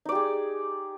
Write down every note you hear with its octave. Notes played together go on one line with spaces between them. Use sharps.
D#4 G4 G#4 D5